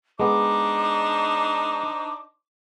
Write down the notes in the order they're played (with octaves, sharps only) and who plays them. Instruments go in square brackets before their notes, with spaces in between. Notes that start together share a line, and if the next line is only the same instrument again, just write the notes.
[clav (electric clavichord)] G#3 B3 [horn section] D4 D#4 C5 [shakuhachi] D6